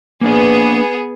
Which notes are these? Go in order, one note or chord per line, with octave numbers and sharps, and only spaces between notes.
A#3 B3 D4 G#4 D5